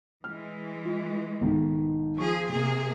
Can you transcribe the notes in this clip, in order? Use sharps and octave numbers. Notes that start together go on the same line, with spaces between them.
E3 G#3 F6
F4
B1 G#2 D#3
F3 G#4 C#6
C3 A#3 G#4